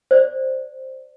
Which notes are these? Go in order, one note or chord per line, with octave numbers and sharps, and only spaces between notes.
C5 D5